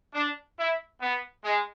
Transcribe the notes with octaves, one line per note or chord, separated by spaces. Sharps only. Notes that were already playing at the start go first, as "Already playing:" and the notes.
D4
E4
B3
G#3